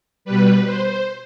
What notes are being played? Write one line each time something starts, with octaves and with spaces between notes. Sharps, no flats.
B2 G3 B4
C5